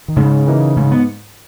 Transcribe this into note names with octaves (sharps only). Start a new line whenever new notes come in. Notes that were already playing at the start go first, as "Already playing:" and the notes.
D#3
G#2 C#3
E3 A#3 D#4
G#2 C#3
B3